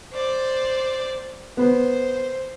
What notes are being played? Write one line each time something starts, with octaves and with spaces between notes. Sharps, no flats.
C5 D5
B3 C5